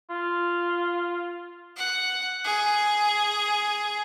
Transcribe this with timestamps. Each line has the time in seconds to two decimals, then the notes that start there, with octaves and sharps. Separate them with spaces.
0.10 F4
1.77 F#5
2.44 G#4